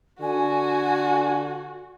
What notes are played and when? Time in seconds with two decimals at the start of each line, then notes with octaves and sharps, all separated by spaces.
0.21 D3 F#4 G#5